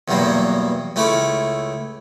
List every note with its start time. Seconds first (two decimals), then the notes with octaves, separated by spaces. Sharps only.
0.08 E2 G2 B2 F#3 A#3
0.96 C#2 A3 C#4 E4 D6